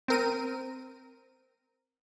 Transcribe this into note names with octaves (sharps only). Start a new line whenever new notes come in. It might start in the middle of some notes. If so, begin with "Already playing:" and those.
C4 A#4 D#7